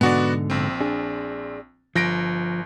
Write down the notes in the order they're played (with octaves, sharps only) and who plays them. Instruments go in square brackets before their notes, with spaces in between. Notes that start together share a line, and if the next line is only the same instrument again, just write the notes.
[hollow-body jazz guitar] G#2 B2 D3 [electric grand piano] B3 F#4 D5
[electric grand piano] A#1 C4
[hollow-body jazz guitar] D4 G#4
[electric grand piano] G1 A#6 D7 [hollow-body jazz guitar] F3